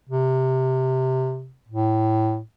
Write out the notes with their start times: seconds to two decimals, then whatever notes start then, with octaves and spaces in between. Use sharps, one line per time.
0.09 C3
1.69 A2